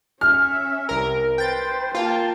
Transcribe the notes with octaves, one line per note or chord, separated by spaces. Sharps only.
C#4 E5 F6
C2 A#4
B4 C5 G5 A6
A#3 F4 G5 A5